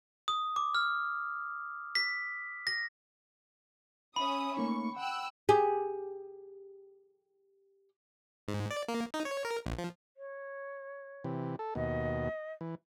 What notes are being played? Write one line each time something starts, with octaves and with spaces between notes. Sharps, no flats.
D#6
D6
F6
B6
A#6
C#4 E5 B5 D#6
A3 A#3 D#4 C#6
F#5 G5 E6 F#6
G4 G#4
G#2
D5
A#3
D#4
C#5
A#4
A#1
F3
C#5
C3 E3
A4
D#2 B2 D#5
E3